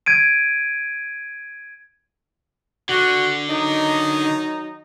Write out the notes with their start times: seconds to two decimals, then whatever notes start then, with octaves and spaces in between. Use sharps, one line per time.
0.06 G#6 D7 D#7
2.89 D3 F#4
3.49 D#3 F#3 D#4